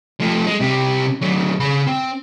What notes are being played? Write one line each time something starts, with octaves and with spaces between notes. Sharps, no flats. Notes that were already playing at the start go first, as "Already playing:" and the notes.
F3 A3
G#3
C3 G3
F#3 A3
C#3 B5
C4